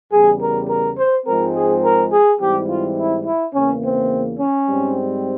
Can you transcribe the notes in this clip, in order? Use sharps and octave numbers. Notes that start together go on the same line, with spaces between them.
E2 C#3 G3 G#4
A#4
A#4
C5
G#2 F3 G#3 C4 A#4
G#4
A#4
G#4
G#2 E3 G3 C4 G4
F4
E4
E4
E2 C#3 E3 A#3 C#4
C4
C#4
G#2 G3 C4